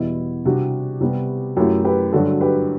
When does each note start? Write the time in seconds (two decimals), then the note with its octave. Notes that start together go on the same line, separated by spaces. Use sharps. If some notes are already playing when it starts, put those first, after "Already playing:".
Already playing: E2 B2 G3 B3 E4
0.45 C3 G3 D4 F#4
1.01 C3 G3 B3
1.57 F#2 F#3 A3 E4 G4
1.85 G4 B4
2.13 G2 D3 F#3 F#4 A4
2.41 G4 B4